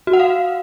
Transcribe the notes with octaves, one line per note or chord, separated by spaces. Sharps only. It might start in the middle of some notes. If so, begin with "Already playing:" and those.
F#4
F#5
F5